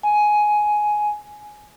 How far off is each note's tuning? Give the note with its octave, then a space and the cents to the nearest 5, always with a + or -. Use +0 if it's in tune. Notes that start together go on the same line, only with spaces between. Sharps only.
G#5 +10